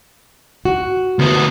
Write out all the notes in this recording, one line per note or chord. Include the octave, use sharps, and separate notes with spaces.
F#4
D2 B3